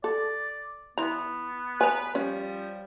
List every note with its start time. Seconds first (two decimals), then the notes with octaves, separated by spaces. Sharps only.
0.04 A4 D5
0.98 E3 B3 A#5
1.81 B4 G#5 A#5
2.15 F3 G3 C#4